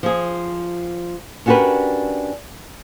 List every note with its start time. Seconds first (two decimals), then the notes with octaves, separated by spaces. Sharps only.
0.03 F3 G#4
1.46 C#4 D4 F#4 G4 A#4 B4